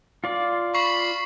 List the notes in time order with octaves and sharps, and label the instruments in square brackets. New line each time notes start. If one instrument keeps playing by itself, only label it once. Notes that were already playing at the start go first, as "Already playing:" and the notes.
[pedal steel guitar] F4 D5
[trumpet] B5 [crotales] C#6 C7 F#7